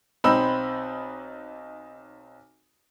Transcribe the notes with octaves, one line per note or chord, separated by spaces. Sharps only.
B1 C4 D#4 B5 E6